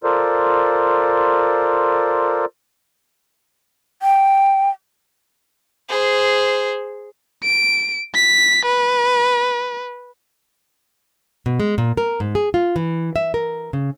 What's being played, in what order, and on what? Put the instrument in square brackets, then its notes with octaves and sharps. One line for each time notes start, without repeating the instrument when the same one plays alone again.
[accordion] F4 A4 A#4 C5 D5
[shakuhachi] G5
[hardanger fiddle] G#4 C5
[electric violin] D7
B6
B4
[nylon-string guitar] B2
G#3
A#2
A#4
G#2
G#4
F4
E3
E5
A#4
C#3